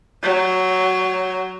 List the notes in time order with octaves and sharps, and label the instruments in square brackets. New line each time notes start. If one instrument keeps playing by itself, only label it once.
[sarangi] F#3